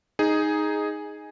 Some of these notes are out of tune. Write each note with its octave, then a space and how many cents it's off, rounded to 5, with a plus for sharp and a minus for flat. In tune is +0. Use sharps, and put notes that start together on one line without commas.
D#4 +0 G#4 +0